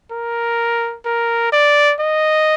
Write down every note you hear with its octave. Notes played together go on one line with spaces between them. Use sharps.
A#4
A#4
D5
D#5